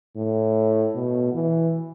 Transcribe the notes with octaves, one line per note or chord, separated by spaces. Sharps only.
A2
B2
E3